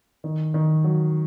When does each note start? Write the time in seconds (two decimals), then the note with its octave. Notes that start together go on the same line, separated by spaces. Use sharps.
0.24 D#3
0.54 D#3
0.84 F#3